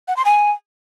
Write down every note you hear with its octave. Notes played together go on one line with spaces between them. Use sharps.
F#5
C6
G#5